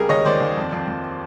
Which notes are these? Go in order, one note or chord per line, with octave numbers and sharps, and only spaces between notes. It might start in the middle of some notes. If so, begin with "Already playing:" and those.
Already playing: C#2 G3 G#4 A#4
D#2 C#5 D#5
D#3 C5 D5
D#2
F2
F2
F2